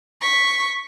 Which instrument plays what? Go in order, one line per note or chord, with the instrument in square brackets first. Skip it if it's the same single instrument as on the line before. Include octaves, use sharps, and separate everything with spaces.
[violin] C#6 B6